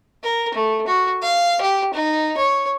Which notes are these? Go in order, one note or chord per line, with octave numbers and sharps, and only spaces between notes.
A#4
A3
F#4
F5
G4
D#4
C#5